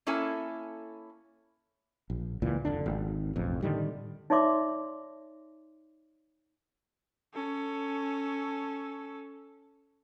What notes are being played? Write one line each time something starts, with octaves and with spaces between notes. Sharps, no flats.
A#3 C#4 E4 A4 G#5
A#1
C#2 A#2 E3
F1 D3 D4
G#1
E1 A1 F2
A2 D3 D#3 G3
D#4 C#5 D5 E5 C6 D6
C#4 A4